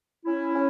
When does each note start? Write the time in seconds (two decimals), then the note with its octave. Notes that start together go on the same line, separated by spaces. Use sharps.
0.25 C#4 E4
0.54 C#4